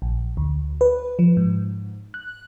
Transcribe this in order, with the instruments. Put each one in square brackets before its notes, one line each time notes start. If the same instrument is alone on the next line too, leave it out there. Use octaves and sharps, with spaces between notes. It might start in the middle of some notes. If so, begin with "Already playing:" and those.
[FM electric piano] A#1
D2
B4
F3
G#2
F#6